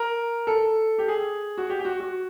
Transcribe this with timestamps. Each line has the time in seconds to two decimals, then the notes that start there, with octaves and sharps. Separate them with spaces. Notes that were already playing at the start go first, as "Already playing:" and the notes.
Already playing: A#4
0.47 A4
0.98 G4
1.08 G#4
1.58 F#4
1.70 G4
1.80 G4
1.85 F#4
2.00 F#4